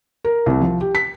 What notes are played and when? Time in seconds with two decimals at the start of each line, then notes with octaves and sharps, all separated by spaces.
0.25 A#4
0.46 C2
0.61 F3
0.81 G4
0.95 B6